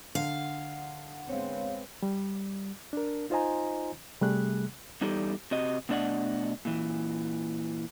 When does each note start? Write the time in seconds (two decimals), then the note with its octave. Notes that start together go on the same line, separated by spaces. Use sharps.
0.15 D3 F5 F#5
1.29 G#3 B3 C4 C#5 F5
2.03 G3
2.93 D4 A#4
3.30 D#4 F4 C5 D#5 G#5 A#5
4.21 C3 G3 A3 G#4 F#6
5.01 E2 G3 D#4 G4 A4
5.51 C3 F#4 D#5
5.89 B2 A3 D4 D5 D#5 F#5
6.65 A#2 E3